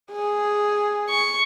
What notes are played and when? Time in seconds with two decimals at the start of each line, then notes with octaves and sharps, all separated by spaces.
0.12 G#4
1.10 C#6